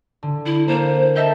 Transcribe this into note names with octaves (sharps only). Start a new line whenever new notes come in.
D3
E4
A#3 C5
A4 D#5 E5 G5